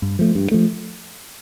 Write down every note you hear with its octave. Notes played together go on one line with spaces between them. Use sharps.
G2
F3 A3
G2
F3 A3